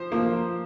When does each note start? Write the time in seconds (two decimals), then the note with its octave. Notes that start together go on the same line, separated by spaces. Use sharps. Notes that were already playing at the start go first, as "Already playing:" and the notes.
Already playing: F3 C5
0.11 F3 A#3